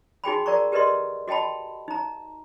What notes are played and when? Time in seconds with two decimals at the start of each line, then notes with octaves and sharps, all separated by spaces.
0.24 D#4 F#4 G#4 G5 G#5 B5
0.46 F#4 A#4 D5 A#5 C#6
0.72 G4 A#4 B4 D5 D#5 C6
1.28 F#4 D#5 G5 A5 B5
1.88 D#4 A#5